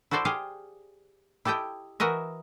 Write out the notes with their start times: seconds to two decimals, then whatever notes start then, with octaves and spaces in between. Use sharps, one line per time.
0.11 E4 F#4 A4 C5 D5 E5
0.25 G4 G#4 F5
1.45 E4 G4 A4 D#5 G5
2.00 E3 F#4 A#4 D#5 E5